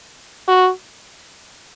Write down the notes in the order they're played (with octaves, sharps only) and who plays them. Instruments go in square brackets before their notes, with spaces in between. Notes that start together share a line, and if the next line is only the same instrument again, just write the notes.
[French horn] F#4